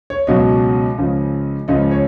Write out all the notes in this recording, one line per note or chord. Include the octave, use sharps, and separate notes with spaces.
C#5
C#2 B2 F#3 D#5
C#2 C#3 F3
C#2 C#3 F3 D#5
C#5